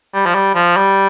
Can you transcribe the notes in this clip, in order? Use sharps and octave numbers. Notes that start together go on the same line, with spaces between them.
G3
F3
G3
F3
G3